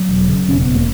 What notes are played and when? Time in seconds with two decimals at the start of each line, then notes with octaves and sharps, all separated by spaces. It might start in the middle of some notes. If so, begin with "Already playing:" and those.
Already playing: F#3
0.09 E1
0.28 C#3
0.48 E1 C#4
0.61 B3
0.67 E1
0.75 A#3